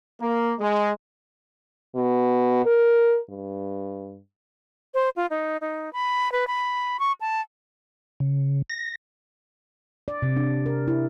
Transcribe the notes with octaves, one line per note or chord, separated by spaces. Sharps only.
A#3
G#3
B2
A#4
G2
C5
F4
D#4
D#4
B5
B4
B5
C#6
A5
C#3
A#6
D5
C3
D4
A#4
E4